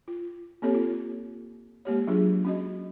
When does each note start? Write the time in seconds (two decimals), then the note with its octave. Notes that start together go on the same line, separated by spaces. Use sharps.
0.08 F4
0.62 A#3 C4 G4 A4 C#5
0.75 F4
1.85 G#3 A#3 G4 C#5
2.07 F#3 D4 F4 G#4
2.45 C#4 F#4 D#5